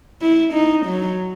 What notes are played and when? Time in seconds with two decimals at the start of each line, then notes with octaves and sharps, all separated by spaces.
0.21 E4
0.53 D#4
0.86 F#3